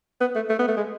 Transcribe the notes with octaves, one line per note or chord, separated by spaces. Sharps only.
B3
A3
A3
B3
A3
G#3